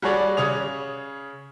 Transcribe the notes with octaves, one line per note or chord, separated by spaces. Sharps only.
G3 F#4 G#4 C#5 D5
C#3 C#5 D#6 F7